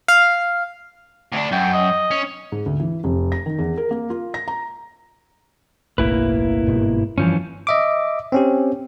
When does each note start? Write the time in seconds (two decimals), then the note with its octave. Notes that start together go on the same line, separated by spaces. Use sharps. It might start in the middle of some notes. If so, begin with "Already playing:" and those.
0.08 F5
1.33 D2 D4
1.52 F#2 G5
1.73 D#5
2.11 C#4
2.52 G#2
2.66 D2
2.80 E3
3.04 F1
3.32 A#6
3.46 D#3
3.59 E2
3.77 A#4
3.91 A#3
4.10 F4
4.34 A#6
4.48 A#5
5.98 F#1 B1 A2 A#3 E4 B4
6.67 G1 G#2 B2
7.18 G2 E3 F3 C#4
7.67 D#5 E5 D6
8.32 C4 C#4 G4